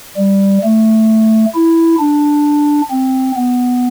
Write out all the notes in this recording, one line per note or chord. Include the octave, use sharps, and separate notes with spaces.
G3
A3
E4
D4
C4
B3